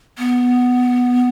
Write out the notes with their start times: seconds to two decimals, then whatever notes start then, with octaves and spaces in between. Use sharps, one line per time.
0.18 B3